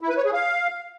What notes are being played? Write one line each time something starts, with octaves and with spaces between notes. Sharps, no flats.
E4
B4
C#5
G#4
F5